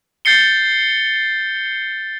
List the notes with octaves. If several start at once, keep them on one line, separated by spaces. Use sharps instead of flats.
G6 A6 C7 C#7 G7